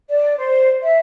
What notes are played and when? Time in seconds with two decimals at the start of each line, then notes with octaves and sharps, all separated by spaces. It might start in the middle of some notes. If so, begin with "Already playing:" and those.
0.09 D5
0.38 C5
0.83 E5